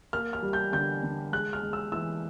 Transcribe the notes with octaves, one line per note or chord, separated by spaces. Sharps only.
A#3 F6
F6
G3
G6
D3 G6
D3
G#3 F#6
F6
G#3
E6
E3 E6